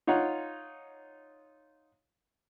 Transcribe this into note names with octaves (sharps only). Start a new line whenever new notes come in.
D#4 F4 C#5 F#5